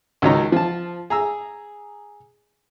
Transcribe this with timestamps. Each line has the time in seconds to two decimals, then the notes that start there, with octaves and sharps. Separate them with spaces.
0.22 C#2 D#3 F#3 C#5 D#5 A#5
0.52 F3 A5
1.10 G#4 A#5 E6